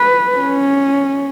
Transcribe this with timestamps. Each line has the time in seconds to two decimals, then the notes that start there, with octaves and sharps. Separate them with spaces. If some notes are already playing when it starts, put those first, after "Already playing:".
Already playing: B4
0.38 C#4